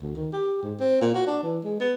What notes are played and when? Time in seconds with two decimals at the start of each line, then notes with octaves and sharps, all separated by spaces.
0.02 D2
0.15 D#3
0.32 G4
0.63 G#2
0.80 C4
1.01 A#2
1.14 F#4
1.26 D4
1.43 E3
1.64 G#3
1.80 B3